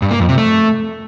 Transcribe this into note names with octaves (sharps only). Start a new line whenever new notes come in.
G2
A#3
F2
C3
A3